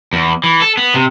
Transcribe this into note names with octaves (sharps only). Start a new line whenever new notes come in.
E2
E3
A4
B3
C3